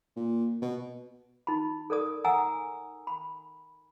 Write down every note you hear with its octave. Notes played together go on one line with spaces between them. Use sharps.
A#2
B2
D#4 B5
A4 A#4 D5 D#6
F#5 G#5 A#5 D#6 E6
B5